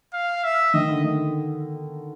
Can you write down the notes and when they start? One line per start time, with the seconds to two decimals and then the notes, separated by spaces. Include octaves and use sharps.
0.14 F5
0.44 E5
0.74 D#3 D#5
0.89 D3
1.04 D#3